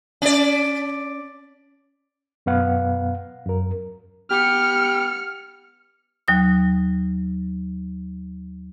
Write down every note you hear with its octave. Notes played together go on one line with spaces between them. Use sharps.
C#4 D5
F#2 B2 B3 F5 F#5
F#2 A#4
B3 G4 F6 C#7
D#2 F#3 D#6